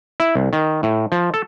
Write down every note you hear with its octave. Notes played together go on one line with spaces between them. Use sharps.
E4
C2
D#3
A2
F3
A4